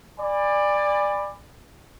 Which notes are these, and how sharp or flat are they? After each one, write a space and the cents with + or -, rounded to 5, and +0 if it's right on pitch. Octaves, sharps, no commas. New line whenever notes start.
D5 +15 G#5 -30 B5 +5